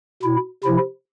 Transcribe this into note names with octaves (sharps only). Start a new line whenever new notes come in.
B2 E4
C3 F3 E4